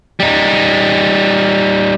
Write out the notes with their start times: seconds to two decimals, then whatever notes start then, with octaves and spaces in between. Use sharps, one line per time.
0.20 G3 D#4